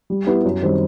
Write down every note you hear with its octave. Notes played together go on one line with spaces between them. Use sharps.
G3
B3 E4 G4
F#2
D#3 G3 C4